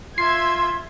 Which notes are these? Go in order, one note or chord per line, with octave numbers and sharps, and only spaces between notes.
F4 E5 C6 G#6 C7